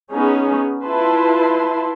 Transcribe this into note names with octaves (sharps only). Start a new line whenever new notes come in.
B3 C#4 D#4 G#4
E4 F4 B4 A5 C6